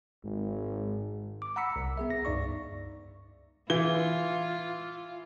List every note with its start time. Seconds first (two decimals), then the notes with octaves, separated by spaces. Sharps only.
0.24 G#1 G#2
1.42 D6
1.56 F#5 A#5 B5 E6 B6 C#7
1.76 C2
1.97 B3 G#4 E5
2.09 C#2 A#6
2.25 C#2 G2 D#4 D5 C#6
3.70 E3 F4 G7